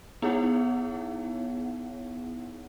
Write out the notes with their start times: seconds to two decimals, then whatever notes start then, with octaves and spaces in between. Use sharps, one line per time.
0.22 B3 D#4 E4 G#4 C#5 F#5